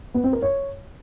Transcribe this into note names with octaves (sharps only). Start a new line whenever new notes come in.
B3
C4
A#4
C#5